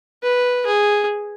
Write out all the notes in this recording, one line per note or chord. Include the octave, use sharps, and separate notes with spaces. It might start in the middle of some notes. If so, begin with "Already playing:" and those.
B4
G#4